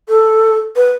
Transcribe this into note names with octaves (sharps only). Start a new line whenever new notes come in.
A4
B4